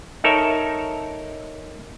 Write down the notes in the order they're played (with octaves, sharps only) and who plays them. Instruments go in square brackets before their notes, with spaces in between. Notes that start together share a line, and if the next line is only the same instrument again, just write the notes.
[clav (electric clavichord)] D#4 A4 A#4 C#5 E5